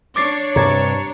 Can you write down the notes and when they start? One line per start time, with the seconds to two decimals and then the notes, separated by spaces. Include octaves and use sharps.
0.16 D4 C#5 D6 A6 C7
0.56 G2 C3 A#5 G#6 A6